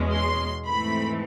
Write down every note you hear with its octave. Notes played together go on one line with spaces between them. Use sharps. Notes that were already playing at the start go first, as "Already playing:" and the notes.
Already playing: E2 B2 G#3 C#4
C6
G#2 E3 A3 C4 B5